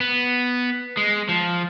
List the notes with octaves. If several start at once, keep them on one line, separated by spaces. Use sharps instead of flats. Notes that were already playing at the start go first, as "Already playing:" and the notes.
B3
G#3
F3